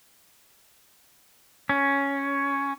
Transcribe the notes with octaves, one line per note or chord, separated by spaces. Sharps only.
C#4